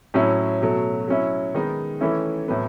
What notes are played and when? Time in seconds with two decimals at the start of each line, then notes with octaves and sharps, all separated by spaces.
0.14 A2 F#3 C#4 E4
0.62 B2 F#3 A3
1.08 F#3 C#4 E4
1.55 D#3 G#3 B3 D#4
2.00 E3 A3 C#4 E4
2.48 A2 F#3 B3